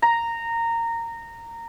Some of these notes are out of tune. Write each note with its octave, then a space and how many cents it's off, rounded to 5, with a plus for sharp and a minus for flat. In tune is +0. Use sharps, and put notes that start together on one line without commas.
A#5 -15